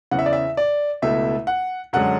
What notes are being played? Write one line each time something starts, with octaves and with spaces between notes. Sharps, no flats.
E2 C#3 E3 F#5
E5
D5
E5
D5
C#2 B2 A3 E4 E5
F#5
F#2 D3 G#3 C#4 F#5